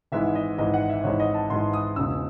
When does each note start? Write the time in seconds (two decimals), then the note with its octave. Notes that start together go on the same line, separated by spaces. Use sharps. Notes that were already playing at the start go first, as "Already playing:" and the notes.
0.12 G#1 G#2 E3 G#3 E5
0.35 D#5
0.58 G#1 G#2 E3 G#3 D#5
0.74 F#5
0.89 E5
1.04 G#1 G#2 E3 G#3 C#5
1.20 D#5
1.34 A5
1.50 G#1 G#2 E3 G#3 C6
1.73 D#6
1.96 E1 E2 C#3 G#3 E6